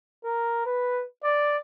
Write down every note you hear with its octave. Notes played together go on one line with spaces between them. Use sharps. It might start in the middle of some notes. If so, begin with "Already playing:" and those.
A#4
B4
D5